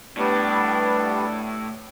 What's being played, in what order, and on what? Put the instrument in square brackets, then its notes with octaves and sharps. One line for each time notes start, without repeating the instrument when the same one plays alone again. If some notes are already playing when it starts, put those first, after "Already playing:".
[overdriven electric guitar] A2 [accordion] G3 B3 [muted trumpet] D4